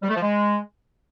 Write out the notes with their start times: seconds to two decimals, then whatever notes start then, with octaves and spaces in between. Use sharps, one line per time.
0.02 G3
0.09 A3
0.16 F3
0.22 G#3